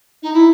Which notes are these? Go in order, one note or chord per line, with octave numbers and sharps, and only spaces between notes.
D#4
E4